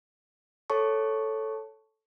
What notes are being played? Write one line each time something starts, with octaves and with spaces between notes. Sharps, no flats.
A4 C#5 A5 C#6